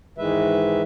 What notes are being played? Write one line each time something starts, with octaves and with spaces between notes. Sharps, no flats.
G#2 D#3 E3 G#3 B4 E5